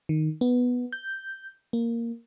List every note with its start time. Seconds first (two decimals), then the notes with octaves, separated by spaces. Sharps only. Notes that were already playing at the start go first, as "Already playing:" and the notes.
0.09 D#3
0.41 B3
0.92 G6
1.73 A#3